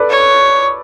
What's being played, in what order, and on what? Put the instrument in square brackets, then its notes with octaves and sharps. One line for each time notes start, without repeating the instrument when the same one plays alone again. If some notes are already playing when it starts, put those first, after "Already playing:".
Already playing: [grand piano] A4 B4 D5
[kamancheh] C#5